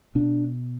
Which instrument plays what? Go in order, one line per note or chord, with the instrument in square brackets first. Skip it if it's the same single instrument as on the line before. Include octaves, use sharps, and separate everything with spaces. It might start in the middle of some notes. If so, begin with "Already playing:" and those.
[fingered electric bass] B2 D4